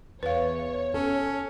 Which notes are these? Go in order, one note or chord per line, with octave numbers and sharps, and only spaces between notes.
E2 B4 C#5 F5
C#4 A4